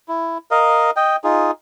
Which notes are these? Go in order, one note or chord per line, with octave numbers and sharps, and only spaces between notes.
E4
A#4 D#5 F5
D#5 G5
D#4 F4 G#4